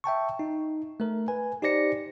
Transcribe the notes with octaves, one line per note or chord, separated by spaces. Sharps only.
E5 G5 A5 C#6
D#4
A3 A#4
B4 G#5
D#4 G4 C5 D5 A#6 C#7